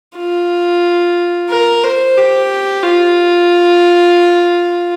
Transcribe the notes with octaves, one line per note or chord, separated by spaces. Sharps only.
F4
A#4
C5
G4
F4